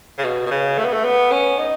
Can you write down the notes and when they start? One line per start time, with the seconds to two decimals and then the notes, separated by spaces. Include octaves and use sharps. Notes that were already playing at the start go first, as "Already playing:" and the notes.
0.18 C#3
0.24 B2
0.46 B2
0.51 C#3
0.78 A3
0.85 B3
0.93 A3
1.05 B3
1.31 C#4
1.59 D#4